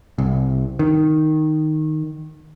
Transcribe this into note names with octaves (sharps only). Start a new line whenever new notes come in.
C2
D#3